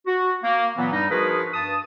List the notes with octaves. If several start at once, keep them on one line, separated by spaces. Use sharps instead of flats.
F#4
A#3
A#2 E3 F#3 B3
G2 G3 D#4
F3 D#4 F#4 G#4 A#4 B4
G2 A5 D#6